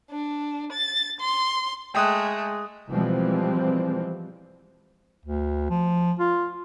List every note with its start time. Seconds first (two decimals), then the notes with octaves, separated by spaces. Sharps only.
0.10 D4
0.72 A6
1.20 C6
1.95 G#3 A3 G5 D#6 F#6
2.89 B2 E3 F3 G3 G#3 C4
5.25 D2
5.70 F3
6.19 F4